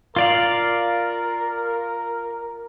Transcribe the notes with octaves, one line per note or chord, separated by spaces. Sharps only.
F4 A#4 D5 F5